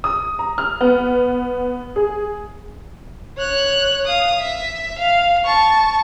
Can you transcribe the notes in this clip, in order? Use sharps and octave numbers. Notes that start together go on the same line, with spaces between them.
D#6
A#5
F6
B3
G#4
C#5 F#6
F5 D#6
E5
F5
A5 C#6